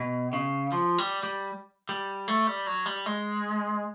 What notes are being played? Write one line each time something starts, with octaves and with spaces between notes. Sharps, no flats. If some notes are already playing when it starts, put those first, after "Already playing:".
Already playing: B2
C#3
F3
G3
G3
G3
A3
G3
F#3
G3
G#3